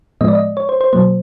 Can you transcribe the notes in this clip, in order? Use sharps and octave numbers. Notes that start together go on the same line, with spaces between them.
A2 F3 G#3 B3 D#5
D5
D#5
C#5
C5
C5
B2 F#3 A#3 C5